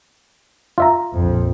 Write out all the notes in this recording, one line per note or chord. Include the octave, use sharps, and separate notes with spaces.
F4 E5 A#5
A#1 F2